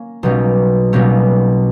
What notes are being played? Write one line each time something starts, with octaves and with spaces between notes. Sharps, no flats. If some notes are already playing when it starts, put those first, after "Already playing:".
Already playing: A#3 C#4
B1 B2 G3 A#3 C#4
B1 B2 G3 A#3 C#4